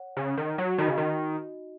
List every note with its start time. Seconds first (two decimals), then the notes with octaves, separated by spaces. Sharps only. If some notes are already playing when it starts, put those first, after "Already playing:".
Already playing: C#5 F#5
0.17 C#3
0.37 D#3
0.58 F#3
0.78 D#3 D#4 F#4 D#5
0.88 C#3
0.98 D#3